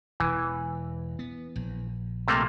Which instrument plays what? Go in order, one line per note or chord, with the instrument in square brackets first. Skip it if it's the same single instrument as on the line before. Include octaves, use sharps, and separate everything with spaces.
[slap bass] E1 [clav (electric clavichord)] E3
[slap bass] B3
A#1
[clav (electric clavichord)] C3 A3 A#3